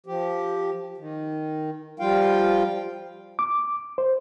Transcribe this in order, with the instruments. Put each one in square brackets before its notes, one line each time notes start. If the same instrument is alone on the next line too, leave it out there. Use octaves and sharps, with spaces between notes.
[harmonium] F3 G4
D#3
F3 G3 F4 F5 G5
[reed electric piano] D6
C5